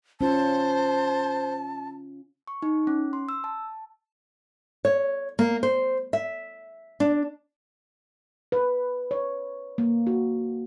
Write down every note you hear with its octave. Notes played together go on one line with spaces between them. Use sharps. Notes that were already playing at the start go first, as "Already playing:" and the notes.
C#4 F4 C5 A5
C#6
D#4
C#4
C6
E6
A5
C#5
A#3
C5
E5
D4
B4
C#5
A#3
F#4